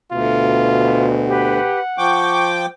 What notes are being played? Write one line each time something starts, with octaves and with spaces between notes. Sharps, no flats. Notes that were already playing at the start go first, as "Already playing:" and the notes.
D2 B2 F4
G4 B4 F#5
F3 G5 C#6 D6